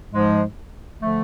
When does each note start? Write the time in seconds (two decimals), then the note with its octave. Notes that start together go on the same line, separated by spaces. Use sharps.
0.12 G#2 F3 G#3
1.00 D3 F3 A3